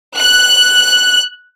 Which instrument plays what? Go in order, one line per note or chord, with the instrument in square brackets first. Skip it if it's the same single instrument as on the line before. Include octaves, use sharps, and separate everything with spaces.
[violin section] F#6